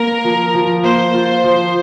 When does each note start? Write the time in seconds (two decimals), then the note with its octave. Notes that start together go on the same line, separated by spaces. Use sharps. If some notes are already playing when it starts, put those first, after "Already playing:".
Already playing: A#3 A#4
0.24 F3
0.54 F3
0.83 A#3 C5
1.14 F4
1.44 F3